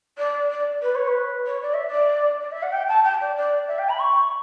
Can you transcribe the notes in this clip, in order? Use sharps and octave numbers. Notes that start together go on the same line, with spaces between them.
D5
D5
B4
C#5
B4
C#5
D5
E5
D5
D5
E5
F#5
G5
A5
G5
D5
D5
E5
G5
B5
C#6